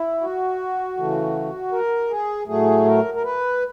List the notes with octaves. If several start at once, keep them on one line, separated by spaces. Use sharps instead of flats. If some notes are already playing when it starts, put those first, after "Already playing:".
Already playing: E4
F#4
C#3 E3 A3
A#4
G#4
A2 F#3 A3 G#4
A#4
A#4
B4